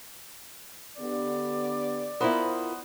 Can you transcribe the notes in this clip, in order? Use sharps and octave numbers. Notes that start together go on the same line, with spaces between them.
D3 B3 G4 D5
B3 E4 F4 A#4 C5 B5